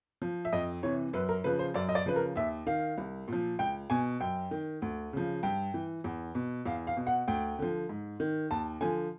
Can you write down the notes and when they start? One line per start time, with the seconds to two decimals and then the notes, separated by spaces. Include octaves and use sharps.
0.22 F3
0.45 E5
0.53 F2 D#5
0.83 C3 E3 C#5
1.13 F#2 B4
1.29 A#4
1.44 C#3 F3 B4
1.59 C5
1.74 F#2 D5
1.89 D#5
1.95 D5
2.06 C#3 F3 B4
2.16 A#4
2.36 D#2 E5
2.66 D#3 F5
2.98 C2
3.28 A#2 F3
3.59 C#2 G5
3.90 B2 G#5
4.20 F#2 G5
4.51 D#3
4.82 D2
5.13 C#3 F3
5.43 G2 G5
5.74 E3
6.04 E2
6.35 B2
6.66 E2 F5
6.87 F5
6.97 B2
7.07 F#5
7.28 D2 G5
7.59 D3 F3
7.89 G#2
8.20 D#3
8.51 D#2 A5
8.80 D3 F3 G#5